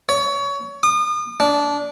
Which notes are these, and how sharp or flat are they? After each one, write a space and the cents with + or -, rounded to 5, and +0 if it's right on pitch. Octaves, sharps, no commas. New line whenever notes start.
C#5 +25
D#6 -40
D4 -20